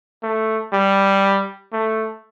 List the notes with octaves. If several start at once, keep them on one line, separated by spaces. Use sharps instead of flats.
A3
G3
A3